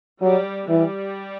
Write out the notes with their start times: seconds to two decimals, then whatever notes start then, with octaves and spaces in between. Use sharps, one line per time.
0.22 F#3 G3
0.69 E3 G3